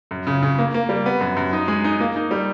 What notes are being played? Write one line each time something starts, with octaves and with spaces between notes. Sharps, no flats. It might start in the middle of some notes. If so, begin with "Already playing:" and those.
F#2
C#3
C#3
A#3
A#3
G3
B3
F#2
F#2
D#4
G#3
D#4
A#3
D#4
G3